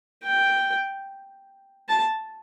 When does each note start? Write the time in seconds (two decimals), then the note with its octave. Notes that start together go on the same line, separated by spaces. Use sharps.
0.24 G5
1.89 A5